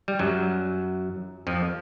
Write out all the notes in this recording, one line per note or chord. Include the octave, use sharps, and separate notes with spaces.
G3
F#2 F#3
F2 F3